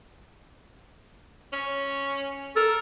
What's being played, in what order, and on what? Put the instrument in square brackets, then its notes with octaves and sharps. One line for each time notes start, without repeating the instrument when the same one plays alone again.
[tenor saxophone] C#4
[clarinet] A4 [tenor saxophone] A#4